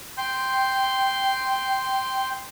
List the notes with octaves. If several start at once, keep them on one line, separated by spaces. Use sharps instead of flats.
G5 C6 G6